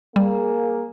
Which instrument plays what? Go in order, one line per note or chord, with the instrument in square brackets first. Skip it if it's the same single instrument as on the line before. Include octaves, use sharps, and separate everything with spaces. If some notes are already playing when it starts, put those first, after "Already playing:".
[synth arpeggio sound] G3 [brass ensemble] A#3 G#4